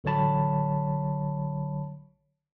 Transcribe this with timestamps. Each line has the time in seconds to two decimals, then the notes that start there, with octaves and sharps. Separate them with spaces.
0.04 A1 D3 F#3 C#5 A5 B5